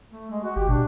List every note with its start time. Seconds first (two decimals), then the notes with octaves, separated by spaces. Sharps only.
0.10 A3
0.31 G#3
0.44 F#4
0.56 G#1 G4
0.69 B2 D4